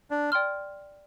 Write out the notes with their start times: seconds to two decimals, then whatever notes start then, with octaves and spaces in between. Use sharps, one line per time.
0.11 D4
0.32 D5 G5 C6 F6